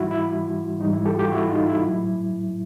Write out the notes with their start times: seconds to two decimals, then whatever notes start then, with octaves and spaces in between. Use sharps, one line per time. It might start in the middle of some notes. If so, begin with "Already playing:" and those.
Already playing: G#2 E3 G3 E4 F#4
0.11 E4
0.79 G#2 E3 G3 D#4
0.93 E4
1.05 G4 A4
1.13 F#4
1.19 F4 G4
1.32 E4 F#4
1.48 D#4 F4
1.66 E4
1.84 A2 F#3